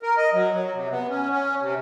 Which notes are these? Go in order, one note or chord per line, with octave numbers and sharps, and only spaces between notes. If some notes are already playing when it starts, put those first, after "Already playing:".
A#4
D#5
F#3
F#3
C3
B3
C#4
C#4
C3